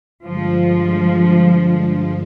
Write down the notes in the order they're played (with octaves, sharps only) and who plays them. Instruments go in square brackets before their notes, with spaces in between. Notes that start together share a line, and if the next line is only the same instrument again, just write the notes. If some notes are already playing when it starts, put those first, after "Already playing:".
[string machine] G2 D3 G#3 [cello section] F3